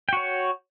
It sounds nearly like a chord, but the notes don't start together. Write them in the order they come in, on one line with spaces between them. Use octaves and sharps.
G5 F#4 C#5